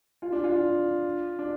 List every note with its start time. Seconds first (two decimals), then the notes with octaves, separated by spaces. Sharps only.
0.22 F4
0.33 D4
0.44 F4
1.39 D4